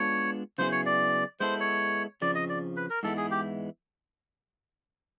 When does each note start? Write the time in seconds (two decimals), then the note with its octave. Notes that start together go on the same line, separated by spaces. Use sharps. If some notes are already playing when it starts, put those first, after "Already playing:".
Already playing: G#3 B3 D4 F4 C#5
0.58 C#3 F#3 B3 E4 G#4 C5
0.72 C#5
0.86 D5
1.40 G#3 B3 E4 A4 C5
1.60 C#5
2.22 F2 C#3 F3 D5
2.35 D#5
2.49 D5
2.76 B4
2.90 A#4
3.03 G#2 E3 G#3 B3 E4 A4
3.17 G#4
3.31 G4